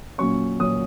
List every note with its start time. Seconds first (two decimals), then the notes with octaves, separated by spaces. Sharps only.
0.18 A#2 F#3 C#4 C#6
0.59 A#2 F#3 C#4 D#6